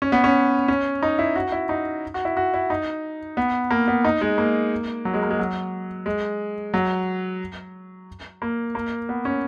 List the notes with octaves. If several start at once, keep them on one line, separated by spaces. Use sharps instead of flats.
C#4
B3
C#4
C#4
D#4
E4
F#4
E4
D#4
F#4
E4
F#4
E4
D#4
B3
A#3
B3
D#4
G#3
A#3
F#3
G#3
A#3
G#3
F#3
G#3
F#3
A#3
A#3
B3
C#4